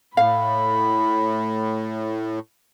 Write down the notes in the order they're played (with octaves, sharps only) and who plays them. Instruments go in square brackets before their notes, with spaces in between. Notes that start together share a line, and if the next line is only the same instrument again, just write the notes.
[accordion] A2 [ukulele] F5 [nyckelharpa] B5